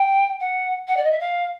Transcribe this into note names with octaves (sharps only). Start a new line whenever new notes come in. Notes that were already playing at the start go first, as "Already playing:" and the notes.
Already playing: G5
F#5
F#5
D5
D#5
E5
F5